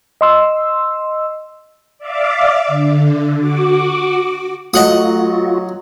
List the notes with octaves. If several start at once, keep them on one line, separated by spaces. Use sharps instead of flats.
D#5 C6 E6
D5 E5 F5 D6
D3
F#4 D6
F#3 A3 F4 F#4 D#5 F#5 D#6